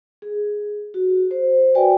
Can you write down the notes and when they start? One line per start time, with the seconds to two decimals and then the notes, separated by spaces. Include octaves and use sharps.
0.22 G#4
0.94 F#4
1.31 C5
1.75 F#4 B4 D5 G5 G#5